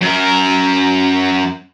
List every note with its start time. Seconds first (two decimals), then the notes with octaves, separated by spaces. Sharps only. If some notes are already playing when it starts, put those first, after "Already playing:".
0.02 F#2 A#4